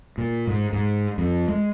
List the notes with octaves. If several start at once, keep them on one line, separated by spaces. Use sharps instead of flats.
A#2
G#2
G#2
F2
G#3